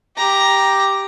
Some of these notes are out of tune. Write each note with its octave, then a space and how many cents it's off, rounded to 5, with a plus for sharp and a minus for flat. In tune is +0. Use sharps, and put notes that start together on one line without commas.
G4 +0 A#5 +10